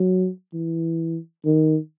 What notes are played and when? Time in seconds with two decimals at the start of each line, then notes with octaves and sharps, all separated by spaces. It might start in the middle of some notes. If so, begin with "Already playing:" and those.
Already playing: F#3
0.53 E3
1.45 D#3